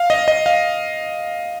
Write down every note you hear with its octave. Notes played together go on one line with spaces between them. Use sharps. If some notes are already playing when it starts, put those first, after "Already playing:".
Already playing: F5
D#5
D#5
F5